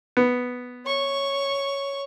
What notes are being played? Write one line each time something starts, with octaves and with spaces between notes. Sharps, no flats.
B3
C#5 C#6